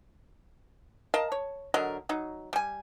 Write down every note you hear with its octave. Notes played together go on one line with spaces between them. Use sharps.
A#4 D#5 F5 A5
C#5
D3 F#3 A#4 D#5
F#3 D#4
G3 G#5